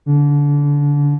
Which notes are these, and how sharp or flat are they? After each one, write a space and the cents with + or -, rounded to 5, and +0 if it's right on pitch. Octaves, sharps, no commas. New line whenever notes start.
D3 -25